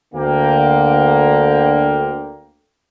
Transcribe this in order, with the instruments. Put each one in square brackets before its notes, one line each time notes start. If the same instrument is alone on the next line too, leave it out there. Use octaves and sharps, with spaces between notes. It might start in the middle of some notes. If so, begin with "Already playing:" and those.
[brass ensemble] D2 D3 A#3 G5